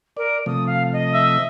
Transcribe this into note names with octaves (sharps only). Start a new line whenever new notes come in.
A#4 D5
C3 F3 A3 D#6
F5
D#5
E5